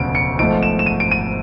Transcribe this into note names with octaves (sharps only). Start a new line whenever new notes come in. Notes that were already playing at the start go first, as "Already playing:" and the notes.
Already playing: E1 D2 C#3 F3 D7
C#7
G#1 G#2 F3 A3 D7
E7
E7
D#7
D7
D#7